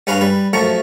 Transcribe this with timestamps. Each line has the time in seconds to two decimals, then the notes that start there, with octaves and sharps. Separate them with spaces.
0.07 G2 C#4 B4 F5 A#5
0.21 G3 B4
0.53 F#2 F3 A3 A#5 C#6